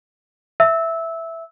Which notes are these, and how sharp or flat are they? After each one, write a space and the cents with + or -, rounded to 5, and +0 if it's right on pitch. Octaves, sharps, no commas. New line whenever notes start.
E5 +0 E6 -15